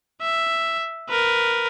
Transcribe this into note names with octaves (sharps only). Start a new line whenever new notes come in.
E5
A#4 B4